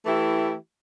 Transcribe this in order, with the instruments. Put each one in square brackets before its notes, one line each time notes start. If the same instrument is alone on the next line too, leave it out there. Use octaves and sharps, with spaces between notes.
[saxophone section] E3 A3 E4 G4